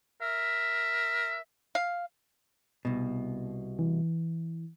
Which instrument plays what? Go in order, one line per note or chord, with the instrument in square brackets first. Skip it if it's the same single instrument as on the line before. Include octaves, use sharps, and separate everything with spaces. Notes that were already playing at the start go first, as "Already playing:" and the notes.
[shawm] A#4 [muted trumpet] E5
[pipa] F5
[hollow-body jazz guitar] C2 B2
[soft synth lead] E3